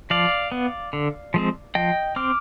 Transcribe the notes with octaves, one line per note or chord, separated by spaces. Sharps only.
F3 D5 F5
B3
D3
F3 G#3 C4
F3 D#5 G5
C4 D6 F6